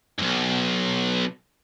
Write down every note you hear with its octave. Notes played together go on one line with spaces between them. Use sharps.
B1 G2